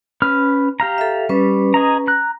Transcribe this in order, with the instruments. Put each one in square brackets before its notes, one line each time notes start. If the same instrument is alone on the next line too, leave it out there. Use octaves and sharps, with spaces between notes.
[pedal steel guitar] C#4 B4 F6
G4 F5 A#5
[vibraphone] A4 E5
[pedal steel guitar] G3 [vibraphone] C#4 B4
[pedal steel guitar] G#4 D#5 A#5
A#5 F#6